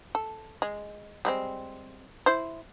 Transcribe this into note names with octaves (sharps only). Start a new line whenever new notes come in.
A4
G#3
G3 G#3 C4
E4 C5